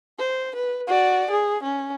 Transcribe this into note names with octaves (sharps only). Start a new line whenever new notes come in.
C5
B4
F#4 D5
G#4
C#4